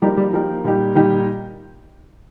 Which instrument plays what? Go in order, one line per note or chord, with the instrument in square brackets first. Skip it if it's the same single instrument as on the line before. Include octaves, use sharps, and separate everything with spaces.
[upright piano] F3 A#3 D#4 G4 A#4 [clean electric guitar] G3
[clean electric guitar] G3
[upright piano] F3 A#3 D#4 G4 A#4
A#2 G3 D#4 G4
[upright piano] A#2 G3 D#4 G4 [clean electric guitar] D#3